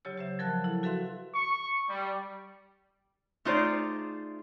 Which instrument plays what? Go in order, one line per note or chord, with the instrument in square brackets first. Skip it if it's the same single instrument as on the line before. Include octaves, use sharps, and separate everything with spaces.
[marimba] C#3 F#3 G4 C#5 E6
G4 C5 E5
F3 F#3 A#4 A5 F#6
E4 A4
F#4 A4 B4 E5 F5 C6
[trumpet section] C#6
G3
[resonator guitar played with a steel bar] A3 D#4 F4 G#4 C5 D5